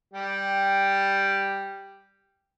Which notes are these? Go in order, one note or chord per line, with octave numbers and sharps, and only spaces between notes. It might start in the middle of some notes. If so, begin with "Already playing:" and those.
G3 G4